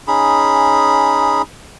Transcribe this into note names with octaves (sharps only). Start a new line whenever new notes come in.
C#4 D#4 G#4 B5